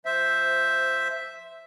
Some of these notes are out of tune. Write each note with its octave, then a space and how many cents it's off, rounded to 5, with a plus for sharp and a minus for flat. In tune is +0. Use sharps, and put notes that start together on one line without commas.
F3 -15 C5 +0 E5 +0